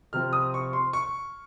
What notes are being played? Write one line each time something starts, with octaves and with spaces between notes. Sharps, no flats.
C3 F3 C4 F6
D#6
C#6
C6
C#6